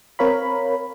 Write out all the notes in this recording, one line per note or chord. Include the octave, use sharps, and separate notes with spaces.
C4 A#4 C#5 F5 B5